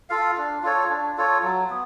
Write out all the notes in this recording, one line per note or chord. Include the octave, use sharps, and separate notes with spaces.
F4 A4 F5
D4
F4 A4 C#5
D4
F4 A4 C#5
F#3
B3